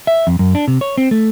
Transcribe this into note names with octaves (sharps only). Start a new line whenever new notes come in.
E5
F2
F#2
D4
C3
C#5
C4
A3